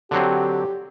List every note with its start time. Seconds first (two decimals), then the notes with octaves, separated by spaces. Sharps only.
0.11 D3 F#3 C4 G4